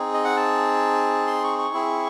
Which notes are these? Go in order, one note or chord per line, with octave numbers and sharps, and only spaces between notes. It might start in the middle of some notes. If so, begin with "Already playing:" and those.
Already playing: C4 D#4 G#4
D#5
F#5
A5
C6
C#6
C#6
C4 E4 G#4